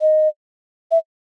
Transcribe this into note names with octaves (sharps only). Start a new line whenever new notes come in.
D#5
E5